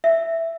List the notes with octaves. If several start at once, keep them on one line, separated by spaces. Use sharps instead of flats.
E5